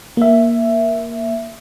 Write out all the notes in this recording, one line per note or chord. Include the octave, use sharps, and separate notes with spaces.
A#3 E5